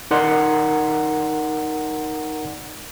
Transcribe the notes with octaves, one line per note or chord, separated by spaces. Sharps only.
D#4 A#4 D5 F#5 A#5 C6